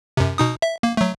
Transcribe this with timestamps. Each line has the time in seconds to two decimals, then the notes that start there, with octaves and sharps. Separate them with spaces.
0.17 F#2 C3
0.38 B2 D#4 D#6
0.62 E5
0.83 A#3
0.97 F#3 A3